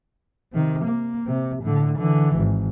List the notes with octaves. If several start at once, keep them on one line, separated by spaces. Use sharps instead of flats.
C3 D#3
A#3
C3
A2 D3
D3 E3
G#1